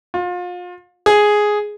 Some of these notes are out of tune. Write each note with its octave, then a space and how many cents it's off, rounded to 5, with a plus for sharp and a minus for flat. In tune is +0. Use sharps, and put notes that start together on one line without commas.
F4 +35
G#4 +5